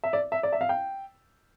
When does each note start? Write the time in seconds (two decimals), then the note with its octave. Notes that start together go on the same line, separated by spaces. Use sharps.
0.04 E5
0.13 D5
0.32 E5
0.43 D5
0.53 E5
0.61 F5
0.69 G5